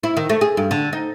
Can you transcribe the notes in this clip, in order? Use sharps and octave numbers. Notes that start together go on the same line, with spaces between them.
E4
D#3
A3
G#4
G2
D3
D#4